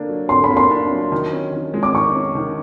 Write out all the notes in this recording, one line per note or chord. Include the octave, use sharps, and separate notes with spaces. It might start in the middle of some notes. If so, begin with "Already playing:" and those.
Already playing: D3 A#3 D4
F#3
D3 C6
B5
A#3
C6
D4
F#3
D#3
C#4
D#3
G#3
D6
D#3 C#6
C#4
D#3